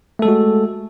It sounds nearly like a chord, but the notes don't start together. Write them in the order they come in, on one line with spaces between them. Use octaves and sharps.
A3 A4 G#3 F#4